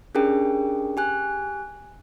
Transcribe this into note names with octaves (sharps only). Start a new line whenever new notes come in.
C#4 D4 G4 G#4 A#4 G5
G4 G#5 F#6